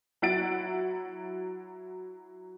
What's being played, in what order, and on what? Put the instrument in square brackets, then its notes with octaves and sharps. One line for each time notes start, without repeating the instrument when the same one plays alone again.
[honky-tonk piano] F#3 E4 F#5 A6 D7